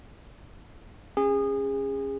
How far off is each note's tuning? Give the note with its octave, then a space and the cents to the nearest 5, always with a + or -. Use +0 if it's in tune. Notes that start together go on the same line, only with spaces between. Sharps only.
C#4 -15 G#4 -25